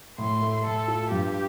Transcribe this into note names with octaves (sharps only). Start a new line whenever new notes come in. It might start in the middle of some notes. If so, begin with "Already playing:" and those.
A2 C6
A3
A2 A4
F4
G2 G4